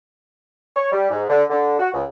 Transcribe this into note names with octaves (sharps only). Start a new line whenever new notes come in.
C#5
G3
G#2
D3
D3
F#4
C#2